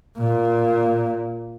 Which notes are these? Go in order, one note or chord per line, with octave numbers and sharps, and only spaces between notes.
A#2